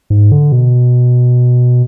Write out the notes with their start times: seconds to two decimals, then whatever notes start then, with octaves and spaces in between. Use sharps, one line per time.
0.10 G#2
0.32 D3
0.52 B2